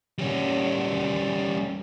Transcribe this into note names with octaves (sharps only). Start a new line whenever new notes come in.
G3 C#4